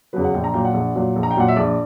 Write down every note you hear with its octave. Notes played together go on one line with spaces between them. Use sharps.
E2 C#3 F#3 B4
F#5
A#1 G5
A#5
A#2 F#3 G5
F#5
A#1
A#2 F#3
A#1
A#5
G5
A#2 F#3 F#5
E5
A#1 D5